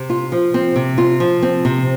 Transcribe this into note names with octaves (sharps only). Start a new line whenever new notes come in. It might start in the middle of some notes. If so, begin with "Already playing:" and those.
Already playing: C3
F4
F3
C4
C3
F4
F3
C4
C3